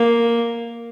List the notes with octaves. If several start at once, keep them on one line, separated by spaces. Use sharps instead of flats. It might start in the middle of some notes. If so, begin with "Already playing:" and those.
Already playing: A#3